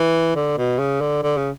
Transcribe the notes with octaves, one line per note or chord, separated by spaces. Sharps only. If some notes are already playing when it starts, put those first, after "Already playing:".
Already playing: E3
D3
B2
C#3
D3
D3
C#3